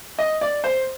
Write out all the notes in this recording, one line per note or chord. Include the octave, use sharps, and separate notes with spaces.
D#5
D5
C5